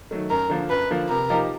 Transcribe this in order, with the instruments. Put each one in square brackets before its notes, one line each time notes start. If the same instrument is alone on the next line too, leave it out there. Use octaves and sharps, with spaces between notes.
[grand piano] D#3 F#3 A3
[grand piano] F#2 [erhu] A#4
[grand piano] D3 F3 A#3
[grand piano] F#2 [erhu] B4
[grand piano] D3 F3 A#3
[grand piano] C3 [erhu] A#4
[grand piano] F3 A#3 D#4 G4